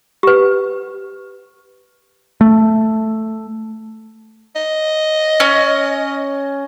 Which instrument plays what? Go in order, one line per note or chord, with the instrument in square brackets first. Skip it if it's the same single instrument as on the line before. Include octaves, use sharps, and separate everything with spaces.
[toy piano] G4 B4
[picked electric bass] A3
[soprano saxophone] D#5
[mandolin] C#4